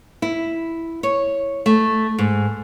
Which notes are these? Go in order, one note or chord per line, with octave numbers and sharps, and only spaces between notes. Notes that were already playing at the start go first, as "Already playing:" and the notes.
E4
C#5
A3
G#2